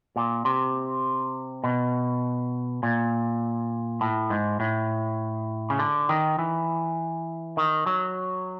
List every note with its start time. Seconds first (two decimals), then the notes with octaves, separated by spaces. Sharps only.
0.16 A#2
0.45 C3
1.64 B2
2.83 A#2
4.01 A2
4.30 G#2
4.60 A2
5.70 C#3
5.79 D3
6.09 D#3
6.39 E3
7.57 D#3
7.86 F#3